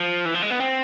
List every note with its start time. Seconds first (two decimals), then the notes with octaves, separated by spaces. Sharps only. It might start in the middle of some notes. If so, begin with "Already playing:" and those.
Already playing: F3
0.25 E3
0.34 F3
0.42 G#3
0.50 B3
0.60 C4